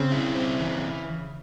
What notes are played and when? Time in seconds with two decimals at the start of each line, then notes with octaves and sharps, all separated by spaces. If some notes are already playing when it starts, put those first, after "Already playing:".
Already playing: C#3 C4
0.12 E4
0.35 C4
0.60 E3